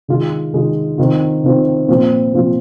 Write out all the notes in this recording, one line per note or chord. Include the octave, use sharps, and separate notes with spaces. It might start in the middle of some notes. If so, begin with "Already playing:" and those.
D#3 G#3 F4
D#3 G#3 F4
D#3 C4 F4
D#3 C4 F4
A#2 F3 C4 F4
A#2 F3 C4 F4